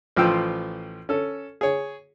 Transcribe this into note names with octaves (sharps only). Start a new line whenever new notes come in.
A1 F3 F4 C5 G5 E6
C#4 A4
G#4 C#5